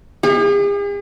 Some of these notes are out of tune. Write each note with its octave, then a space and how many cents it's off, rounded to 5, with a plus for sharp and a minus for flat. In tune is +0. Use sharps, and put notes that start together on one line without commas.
G#4 -45